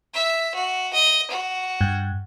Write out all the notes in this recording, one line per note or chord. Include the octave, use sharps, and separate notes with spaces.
E5
F#4
D#5
F#4
G2